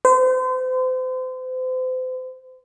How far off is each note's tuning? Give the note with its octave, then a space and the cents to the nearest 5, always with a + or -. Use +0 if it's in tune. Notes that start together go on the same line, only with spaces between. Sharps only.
C5 -35